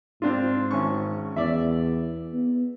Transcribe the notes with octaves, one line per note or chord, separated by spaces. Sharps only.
G#2 C4 D4 F4
G#1 C#4 C#6
E2 D5 E5
B3